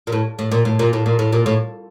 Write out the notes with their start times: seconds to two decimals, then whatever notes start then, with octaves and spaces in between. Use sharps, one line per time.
0.07 A#2
0.12 A2
0.39 A2
0.52 A#2
0.65 A2
0.79 A#2
0.93 A2
1.06 A#2
1.19 A2
1.33 A#2
1.46 A2